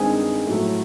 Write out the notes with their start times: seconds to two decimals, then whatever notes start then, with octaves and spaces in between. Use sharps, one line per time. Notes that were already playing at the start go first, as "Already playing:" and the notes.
Already playing: G2 D#3 G#3 C4 G#4 G#5
0.46 A2 F#3 A3